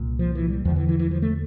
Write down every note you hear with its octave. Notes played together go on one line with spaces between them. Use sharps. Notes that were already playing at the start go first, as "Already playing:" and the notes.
Already playing: C2 A#2
F3
E3
G3
E2 D3 F3
E3
E3
E3
F3
A3